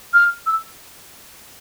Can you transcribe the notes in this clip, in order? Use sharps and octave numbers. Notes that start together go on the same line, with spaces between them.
F6
E6